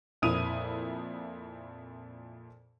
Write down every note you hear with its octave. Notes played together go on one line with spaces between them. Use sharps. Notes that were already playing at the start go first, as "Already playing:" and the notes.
F2 A#2 E4 D#6 D#7 F7